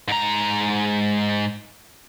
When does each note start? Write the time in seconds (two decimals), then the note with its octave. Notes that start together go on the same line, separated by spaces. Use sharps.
0.08 G#2 A#5